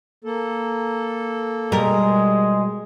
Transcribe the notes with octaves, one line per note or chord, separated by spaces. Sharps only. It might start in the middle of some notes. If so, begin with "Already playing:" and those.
A#3 A4
B2 G3 G#3 A#4